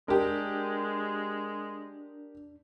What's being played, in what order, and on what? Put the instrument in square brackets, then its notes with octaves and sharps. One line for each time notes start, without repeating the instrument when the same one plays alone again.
[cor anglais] G#3 [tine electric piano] D4 [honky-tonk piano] G4 A#4